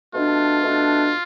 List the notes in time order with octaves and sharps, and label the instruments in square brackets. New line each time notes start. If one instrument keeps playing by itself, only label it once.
[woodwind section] B2 A3 D4 [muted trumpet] F4
[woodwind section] B2 A3 D4